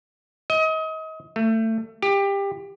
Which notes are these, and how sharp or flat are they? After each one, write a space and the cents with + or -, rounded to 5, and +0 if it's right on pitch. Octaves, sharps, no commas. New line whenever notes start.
D#5 +30
A3 +25
G4 +20